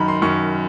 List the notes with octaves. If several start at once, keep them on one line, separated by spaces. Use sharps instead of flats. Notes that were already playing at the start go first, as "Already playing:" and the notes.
Already playing: F#2 D#3 A#5 B5
C6
F#2 D#3 C#6